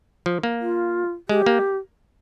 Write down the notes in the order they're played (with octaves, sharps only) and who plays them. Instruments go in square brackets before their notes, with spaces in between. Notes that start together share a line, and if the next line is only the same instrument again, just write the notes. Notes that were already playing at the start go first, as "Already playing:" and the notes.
[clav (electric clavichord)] F3
A#3
[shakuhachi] F4
[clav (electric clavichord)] G#3 [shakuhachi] G4
[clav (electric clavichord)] A#3